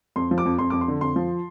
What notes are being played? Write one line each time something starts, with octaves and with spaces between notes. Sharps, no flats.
F2 C6
F3
D6
F2
F2 C6
F2 D6
C6
D3
F2 C6
F3